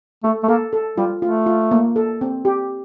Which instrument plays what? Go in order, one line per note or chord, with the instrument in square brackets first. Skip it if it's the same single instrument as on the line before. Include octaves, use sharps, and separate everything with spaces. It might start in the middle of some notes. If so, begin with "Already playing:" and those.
[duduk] A3 [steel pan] A4
[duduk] A3
[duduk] A#3 [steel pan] A4
[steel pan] A4
[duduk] G3 [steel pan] F4
[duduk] A3 [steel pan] F4
[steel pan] F4
A#3
A4
C4
G4